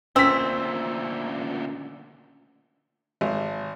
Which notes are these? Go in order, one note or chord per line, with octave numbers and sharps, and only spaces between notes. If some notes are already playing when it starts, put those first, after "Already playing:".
D2 A#2 C4 C#4 E6 B6
G#1